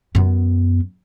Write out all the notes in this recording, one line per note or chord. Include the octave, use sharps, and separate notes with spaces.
F#2 B3